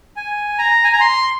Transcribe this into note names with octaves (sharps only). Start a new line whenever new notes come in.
G#5
A#5
G#5
A#5
C6